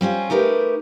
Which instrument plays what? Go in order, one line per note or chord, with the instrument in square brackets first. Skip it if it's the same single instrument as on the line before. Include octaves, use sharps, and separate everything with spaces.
[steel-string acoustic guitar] G3 C4 C#4 F4
A3 D#4 G4 A#4 B4